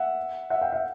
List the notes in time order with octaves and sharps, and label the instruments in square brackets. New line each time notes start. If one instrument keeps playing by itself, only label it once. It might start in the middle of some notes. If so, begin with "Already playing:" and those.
Already playing: [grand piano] E5 F#5
E5 F#5
F5 G5
E5 F#5